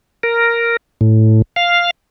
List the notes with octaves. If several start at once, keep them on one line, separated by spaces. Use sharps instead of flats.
A#4
A2
F5